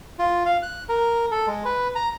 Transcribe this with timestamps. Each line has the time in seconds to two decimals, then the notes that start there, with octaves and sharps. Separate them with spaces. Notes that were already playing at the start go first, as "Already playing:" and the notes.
0.19 F4
0.46 F5
0.63 F#6
0.89 A#4
1.31 A4
1.47 G#3
1.65 B4
1.95 A#5